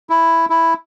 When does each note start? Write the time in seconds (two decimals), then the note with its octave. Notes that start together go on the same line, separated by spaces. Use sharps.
0.10 E4
0.50 E4